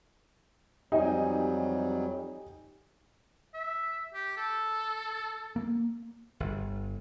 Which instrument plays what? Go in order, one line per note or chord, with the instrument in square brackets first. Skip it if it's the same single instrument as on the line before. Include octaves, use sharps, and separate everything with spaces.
[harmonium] F2 F#3 G3 [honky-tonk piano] D#4 G4 G#5
[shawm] E5
G4
A4
[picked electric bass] A#3
[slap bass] G1